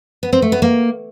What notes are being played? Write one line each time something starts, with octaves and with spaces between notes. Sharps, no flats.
B3
C4
A3
B3
A#3